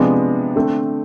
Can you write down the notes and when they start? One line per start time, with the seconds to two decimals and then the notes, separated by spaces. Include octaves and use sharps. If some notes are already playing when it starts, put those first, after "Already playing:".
Already playing: C3 F3 G#3 B3 D4
0.56 D3 A3 C4